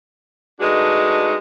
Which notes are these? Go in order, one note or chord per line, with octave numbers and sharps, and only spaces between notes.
G#3 A3 D4 D#4 F#4 B4